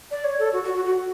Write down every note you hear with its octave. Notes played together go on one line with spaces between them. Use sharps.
D5
C#5
A4
F#4
F#4
F#4
F#4